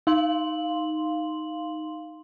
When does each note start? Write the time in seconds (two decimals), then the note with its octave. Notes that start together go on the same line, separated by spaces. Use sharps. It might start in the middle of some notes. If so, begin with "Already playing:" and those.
0.07 D#4 F5 C6 F#7